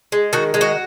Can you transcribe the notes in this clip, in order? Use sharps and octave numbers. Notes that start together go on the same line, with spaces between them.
G#3
D#3 F#4
G#3
F#4